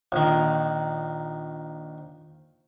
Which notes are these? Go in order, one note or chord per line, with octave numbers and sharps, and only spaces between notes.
A#1 D#3